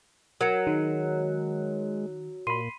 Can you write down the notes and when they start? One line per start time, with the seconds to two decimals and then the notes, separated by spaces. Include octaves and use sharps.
0.41 F#3 A#4 C#7
0.67 D#3 G#3
2.47 A#2 B5 C6 D#7